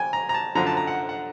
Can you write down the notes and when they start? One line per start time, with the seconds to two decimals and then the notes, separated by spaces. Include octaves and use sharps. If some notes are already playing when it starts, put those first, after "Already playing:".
Already playing: G5 G#5
0.13 A#5
0.29 A#5
0.34 A5
0.55 F#2 D3 F3 A#5
0.67 A5
0.77 A#5
0.87 F#5
1.09 F#5